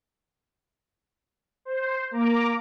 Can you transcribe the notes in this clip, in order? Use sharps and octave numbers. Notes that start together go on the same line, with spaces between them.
C5
A#3 A#5 D6